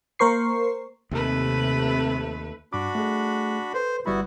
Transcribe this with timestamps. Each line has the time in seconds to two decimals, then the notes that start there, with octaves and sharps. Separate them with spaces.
0.19 A#3 A#4 C5 C#6 C7
1.11 D#2 C3 A3 B4
2.73 G2 D4 F#4 B5 D6
2.95 A3 G#4
3.74 A4 B4 C5
4.06 G1 G3 B3 E4 F#4 B5